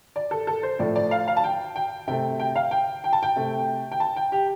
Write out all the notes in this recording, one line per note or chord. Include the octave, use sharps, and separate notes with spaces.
D5
A4
A4
C5
A2 F3 A3 D5
D5
F5
F5
A5
G5
G5
C3 A3 G5
G5
F5
G5
G5
A5
G5
C3 A3
G5
A5
G5
G4